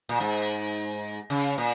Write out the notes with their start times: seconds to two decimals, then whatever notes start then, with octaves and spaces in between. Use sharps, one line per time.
0.09 A#2
0.20 G#2
1.30 C#3
1.58 A#2